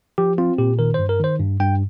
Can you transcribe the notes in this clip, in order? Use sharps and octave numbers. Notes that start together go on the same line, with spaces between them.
F3 G4
C4 F4
A#2 G4
D#3 A#4
G2 C5
A#4
D#3 C5
G2
G2 G5